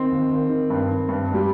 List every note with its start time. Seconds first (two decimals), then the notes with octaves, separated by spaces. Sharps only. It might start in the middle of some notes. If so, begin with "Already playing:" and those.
Already playing: D#3 C4
0.11 D#2
0.30 D#3
0.49 D#3
0.70 G2
0.89 D#3
1.09 G2
1.28 G2
1.34 G3